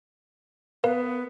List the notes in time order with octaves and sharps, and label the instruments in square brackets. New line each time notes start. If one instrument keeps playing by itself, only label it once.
[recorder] B3 [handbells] A#4 B4 F5